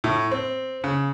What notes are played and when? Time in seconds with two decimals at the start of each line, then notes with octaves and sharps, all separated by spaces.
0.04 A2
0.31 C4
0.84 C#3